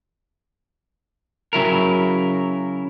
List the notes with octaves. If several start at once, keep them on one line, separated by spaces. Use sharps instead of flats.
C#3 F#3 E4 A#4